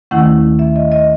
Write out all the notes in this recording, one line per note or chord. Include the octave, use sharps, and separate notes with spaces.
D#2 D#3 A3 C#4 E4 F#5
E5
D#5
D#5